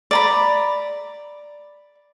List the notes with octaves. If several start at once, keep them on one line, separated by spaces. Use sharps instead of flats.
D5 A#5 B5